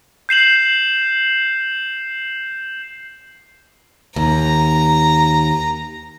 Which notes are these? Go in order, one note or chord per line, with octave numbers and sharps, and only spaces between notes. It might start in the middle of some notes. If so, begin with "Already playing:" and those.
G6 C7 E7 F#7
D#2 A#5